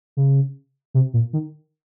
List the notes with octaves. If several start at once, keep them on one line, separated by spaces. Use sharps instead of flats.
C#3
C3
A#2
D#3